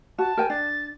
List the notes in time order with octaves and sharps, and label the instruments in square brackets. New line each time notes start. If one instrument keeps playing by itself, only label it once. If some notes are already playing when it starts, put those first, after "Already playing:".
[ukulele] F#4 [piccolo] A5
[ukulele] A#4 G5 G#5
[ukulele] D4 [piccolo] A6